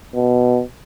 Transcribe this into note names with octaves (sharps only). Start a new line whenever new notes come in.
B2